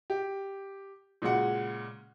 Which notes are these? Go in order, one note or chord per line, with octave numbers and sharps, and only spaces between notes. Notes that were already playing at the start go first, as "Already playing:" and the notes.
G4
A#2 C#3 G#3 F#4 F#5